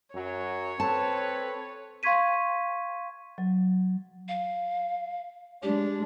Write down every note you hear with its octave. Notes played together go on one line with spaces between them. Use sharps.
F#2 F#3 C#5
C4 A4 B4 A5
F5 C6 C#6 G#6 B6 D#7
F#3
F5
G#3 D4 G4